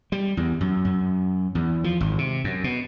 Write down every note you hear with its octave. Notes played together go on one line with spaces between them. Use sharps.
G3
E2
F#2
F#2
E2
F3
G#1
C3
F#2
B2